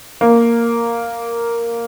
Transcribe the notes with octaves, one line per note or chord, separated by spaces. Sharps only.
A#3